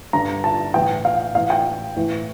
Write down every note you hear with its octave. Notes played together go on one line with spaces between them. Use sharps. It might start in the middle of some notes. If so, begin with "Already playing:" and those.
G2 D3 A#5
A5
A2 E3 G5
F5
A2 E3 F5
G5
A2 E3